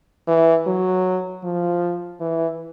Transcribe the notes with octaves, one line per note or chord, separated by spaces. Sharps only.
E3
F#3
F3
E3